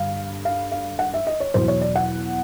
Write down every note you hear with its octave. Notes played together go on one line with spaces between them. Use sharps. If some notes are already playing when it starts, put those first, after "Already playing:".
Already playing: G2 D3 G3 F5
F5
F5
F#5
E5
D#5
C#5
E2 B2 F#3 C5
C#5
D5
F#5